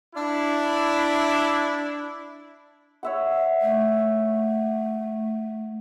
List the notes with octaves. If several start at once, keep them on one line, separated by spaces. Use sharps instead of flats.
D4 E4
C#5 E5 F#5
A3